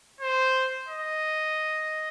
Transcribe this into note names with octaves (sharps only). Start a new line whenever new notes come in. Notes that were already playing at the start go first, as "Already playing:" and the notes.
C5
D#5